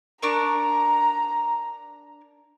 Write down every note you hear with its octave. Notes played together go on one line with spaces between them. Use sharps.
D4 A#4 A#5 C#6